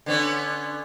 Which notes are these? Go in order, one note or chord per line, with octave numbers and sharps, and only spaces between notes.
D3 B3 C#4